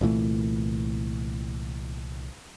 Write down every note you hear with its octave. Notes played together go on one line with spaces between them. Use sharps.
C2 A#2 E3 A3